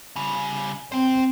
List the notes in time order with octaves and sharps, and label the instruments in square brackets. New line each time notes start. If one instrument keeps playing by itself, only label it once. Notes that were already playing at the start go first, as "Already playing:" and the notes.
[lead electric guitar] C#3 G3
[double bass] C4 [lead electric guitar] C5 G5